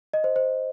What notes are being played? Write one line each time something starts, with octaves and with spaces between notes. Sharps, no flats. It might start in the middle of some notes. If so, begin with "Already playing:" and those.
D#5
C5
C5